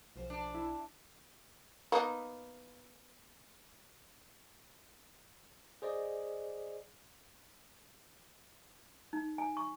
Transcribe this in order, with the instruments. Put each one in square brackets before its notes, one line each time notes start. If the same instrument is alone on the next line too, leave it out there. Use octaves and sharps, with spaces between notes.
[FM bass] B1 [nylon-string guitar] C#3 F3 C5
[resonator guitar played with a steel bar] D4
[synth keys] E4
[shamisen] A#3 B3 D#4
[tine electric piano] G#4 C5 D5 D#5
[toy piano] D#4
G#5
C#6